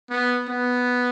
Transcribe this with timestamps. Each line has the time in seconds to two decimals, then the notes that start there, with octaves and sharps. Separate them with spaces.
0.10 B3
0.48 B3